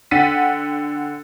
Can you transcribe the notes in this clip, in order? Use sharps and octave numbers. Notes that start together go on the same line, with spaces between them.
D3 F#5 G5 A6 B6 D#7